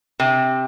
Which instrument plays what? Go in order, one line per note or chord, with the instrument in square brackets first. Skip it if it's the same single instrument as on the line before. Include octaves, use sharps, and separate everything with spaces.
[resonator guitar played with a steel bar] C3